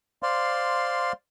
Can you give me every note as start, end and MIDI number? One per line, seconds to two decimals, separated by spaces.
0.23 1.12 72
0.23 1.12 74
0.23 1.12 77
0.23 1.12 84